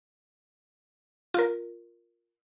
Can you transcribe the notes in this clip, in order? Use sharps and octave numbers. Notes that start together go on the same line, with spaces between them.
F4 A#4